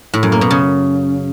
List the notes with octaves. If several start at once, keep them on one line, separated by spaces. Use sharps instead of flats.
A2
F#2
A#3
B2
C#3